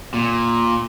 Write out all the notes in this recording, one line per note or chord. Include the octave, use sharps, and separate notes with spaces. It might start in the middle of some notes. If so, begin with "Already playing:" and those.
A#2